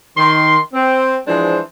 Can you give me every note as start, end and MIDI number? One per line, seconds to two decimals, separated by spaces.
0.17 0.57 51
0.17 0.57 84
0.73 1.14 60
1.26 1.58 52
1.26 1.58 53
1.26 1.58 56
1.26 1.58 62
1.26 1.58 68
1.26 1.58 72